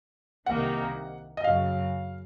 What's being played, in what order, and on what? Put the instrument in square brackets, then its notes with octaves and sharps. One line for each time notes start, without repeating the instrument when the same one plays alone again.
[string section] C2 C3 D#3 A#3 D#4 [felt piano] F#5
[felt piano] D#5
[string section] F#2 C#3 F#3 [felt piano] F5